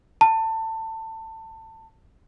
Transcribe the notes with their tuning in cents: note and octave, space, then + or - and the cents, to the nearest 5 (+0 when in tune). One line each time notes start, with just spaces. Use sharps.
A5 +25